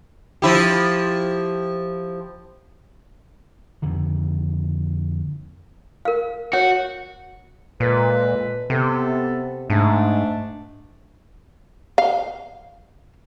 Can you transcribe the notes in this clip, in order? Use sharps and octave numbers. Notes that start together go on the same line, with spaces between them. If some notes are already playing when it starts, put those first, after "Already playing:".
F3 E4 G4
F2 D3 D#3
A#4 F5
F#4 C#5 F#5
A#2 G#3 A4 B4
C3 B3 A4
G#2 A3 D4
F5